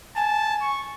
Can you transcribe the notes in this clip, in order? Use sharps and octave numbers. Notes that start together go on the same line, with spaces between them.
G#5 A5
C#6